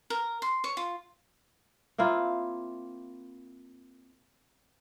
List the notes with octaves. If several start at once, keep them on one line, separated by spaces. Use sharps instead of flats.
A#4
C6
C#5
F4
A#3 C4 E4 F4